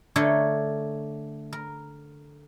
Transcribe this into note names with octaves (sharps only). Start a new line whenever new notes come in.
D3 A3 A#4 C#5
A#4